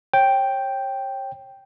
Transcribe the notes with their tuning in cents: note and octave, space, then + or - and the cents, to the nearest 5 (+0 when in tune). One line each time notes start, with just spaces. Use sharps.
C#5 -30 G5 +0